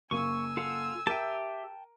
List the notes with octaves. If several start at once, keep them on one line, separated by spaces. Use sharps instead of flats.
F#1 A#3 G#5 C#6 E6 D#7
F4 A4 F#5
G4 A#4 E5 G5 A5 D#7